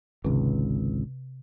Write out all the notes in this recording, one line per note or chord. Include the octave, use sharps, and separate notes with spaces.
G#1 C#2 C3